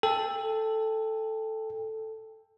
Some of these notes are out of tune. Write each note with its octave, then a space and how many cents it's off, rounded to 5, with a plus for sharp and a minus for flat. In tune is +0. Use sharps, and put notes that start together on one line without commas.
A4 +0 G5 +25